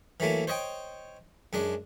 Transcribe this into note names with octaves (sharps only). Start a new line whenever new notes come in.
E3 F#3 A3 A#3
C5 C#5 D#5 G5
F#2 G#3 D4